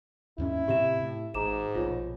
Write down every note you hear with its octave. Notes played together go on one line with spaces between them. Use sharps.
D#2 G#2 C#4 E4
A2 C3 C4 G4 E5 E7
A2
G#1 G#2 A#5 D6 E7
A#1 B2 F4 C#5